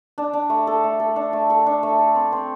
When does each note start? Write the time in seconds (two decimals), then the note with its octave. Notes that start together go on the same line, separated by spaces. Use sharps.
0.18 D4
0.33 D4
0.50 A3
0.67 A4
0.84 A3
1.00 A4
1.16 D4
1.33 A3
1.50 A4
1.66 D4
1.83 A3
1.98 A4
2.15 C4
2.32 C4